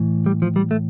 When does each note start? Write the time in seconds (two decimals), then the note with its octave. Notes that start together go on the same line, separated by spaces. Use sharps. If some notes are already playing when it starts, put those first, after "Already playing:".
Already playing: A2 E3
0.26 G3
0.42 F3
0.56 G3
0.71 A3